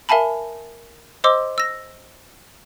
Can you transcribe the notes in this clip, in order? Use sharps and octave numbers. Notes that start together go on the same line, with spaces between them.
A#4 E5 F5 G#5 A5 B5
C5 D#5 C6 D6 E6
E6 A#6